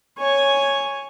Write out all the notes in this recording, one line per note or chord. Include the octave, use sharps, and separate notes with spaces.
C#5 G#5